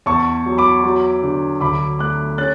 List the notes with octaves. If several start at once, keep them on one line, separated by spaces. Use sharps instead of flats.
E2 A5 C#6
F#3
B5 D6
F#3
D3
D2 B5 D6
A3 D6 F#6
C#4 F#6 A6